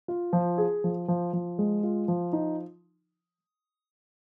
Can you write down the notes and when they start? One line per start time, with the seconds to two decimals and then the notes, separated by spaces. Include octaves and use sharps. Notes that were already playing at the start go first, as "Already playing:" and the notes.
0.08 F4
0.33 F3
0.58 G#4
0.84 F3
1.08 F3
1.33 F3
1.58 G#3
1.83 F4
2.08 F3
2.33 D#4